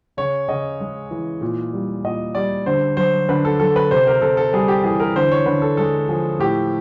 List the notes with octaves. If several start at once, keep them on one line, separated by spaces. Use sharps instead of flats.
C#3 C#5
C#3 D#5
G#3
E3
A#2
G3
A#2 D#5
G3 D5
D3 C5
F#3 C5
D3 B4
A4
F#3 A4
B4
C3 C5
A#4
C3 A4
A4
G3 G#4
G4
E3 G#4
A#4
D3 C5
C#5
D3 B4
A4
G#3 A4
F3 G#4
A2 G4